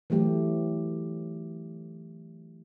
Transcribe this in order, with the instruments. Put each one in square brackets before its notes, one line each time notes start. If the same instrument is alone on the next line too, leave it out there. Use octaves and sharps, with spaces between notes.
[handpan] E3 F#3 A3 G4